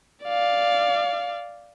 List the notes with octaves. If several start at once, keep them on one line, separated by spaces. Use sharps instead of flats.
D5 F5